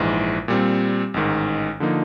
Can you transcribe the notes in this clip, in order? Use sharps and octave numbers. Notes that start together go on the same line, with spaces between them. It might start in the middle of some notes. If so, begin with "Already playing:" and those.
Already playing: A#1 G#2 E3
A#2 G3 C4
A1 G#2 D#3
D3 F3 A#3 D#4